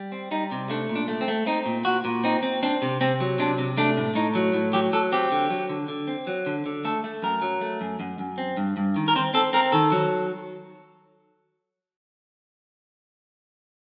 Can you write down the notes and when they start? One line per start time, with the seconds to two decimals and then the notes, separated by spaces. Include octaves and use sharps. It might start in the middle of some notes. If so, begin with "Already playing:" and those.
Already playing: G3
0.12 C4
0.31 G3 D#4
0.52 C3
0.70 A3 D4
0.89 A#2
0.95 D4
1.08 A3
1.21 C4
1.28 A3
1.46 C4 D#4
1.66 A#2
1.85 A#2 F#4
2.05 A#2
2.24 C4 D#4
2.43 C4
2.63 C4 D4
2.82 C3
3.01 C3 C4
3.20 F#3
3.39 C3 D4
3.58 C3
3.77 A3 D4
3.97 A2
4.15 A2 D#4
4.35 F#3
4.54 A2
4.73 F#3 G4
4.93 F#3 A4
5.12 C4 G4
5.32 D3
5.50 F#3
5.69 D3
5.88 D3
6.08 C4
6.27 F#3
6.46 D3
6.66 D3
6.85 A3 A4
7.04 A3
7.23 F#2 A#4
7.42 F#3
7.61 A3
7.81 F#2
8.00 F#2
8.19 F#2
8.38 C4
8.57 G2
8.77 G2
8.96 D#3
9.08 A#4
9.16 C4 C5
9.34 C4 A4
9.53 C4 A#4
9.72 D#3 A4
9.92 F#3